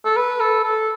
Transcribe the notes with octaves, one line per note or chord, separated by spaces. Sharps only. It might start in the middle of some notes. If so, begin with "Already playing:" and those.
A4
B4
A4
A4